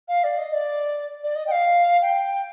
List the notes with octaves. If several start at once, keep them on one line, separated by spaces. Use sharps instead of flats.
F5
D5
D#5
D5
D5
D#5
G5
F5
G5